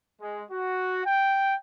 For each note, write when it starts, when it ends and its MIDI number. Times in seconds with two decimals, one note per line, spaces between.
0.21 0.44 56
0.51 1.04 66
1.06 1.56 79